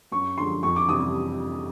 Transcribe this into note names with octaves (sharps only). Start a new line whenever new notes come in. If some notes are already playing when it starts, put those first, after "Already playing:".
F#2 C#6
D3 F3 G#3 C6
F2 C#6
D6
C3 E3 G3 D#6